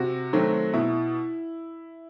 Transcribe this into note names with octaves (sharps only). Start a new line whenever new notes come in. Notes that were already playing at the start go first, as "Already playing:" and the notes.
Already playing: C3 F#4
D#3 F#3 A3 C4
B2 E4